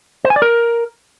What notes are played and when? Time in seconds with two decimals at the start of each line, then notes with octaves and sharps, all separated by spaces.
0.25 C5
0.30 G#5
0.36 D5
0.42 A#4